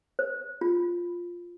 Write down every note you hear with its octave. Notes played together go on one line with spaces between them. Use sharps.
C5
F4